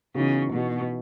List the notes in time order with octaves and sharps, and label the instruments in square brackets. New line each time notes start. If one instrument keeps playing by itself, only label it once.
[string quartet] C#3 [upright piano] E3 B3 D#4 F#4
[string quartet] B2 [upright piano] E3 B3 D#4 F#4